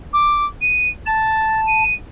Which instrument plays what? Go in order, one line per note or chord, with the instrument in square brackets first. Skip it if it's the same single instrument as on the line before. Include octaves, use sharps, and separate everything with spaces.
[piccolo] D6
D#7
[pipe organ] A5 [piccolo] A6
[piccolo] D#7